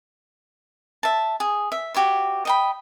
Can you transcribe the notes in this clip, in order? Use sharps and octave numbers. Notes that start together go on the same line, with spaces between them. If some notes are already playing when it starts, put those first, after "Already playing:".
E5 A5
G#4
E5
F#4 G4 C#5 E5
D#5 G5 B5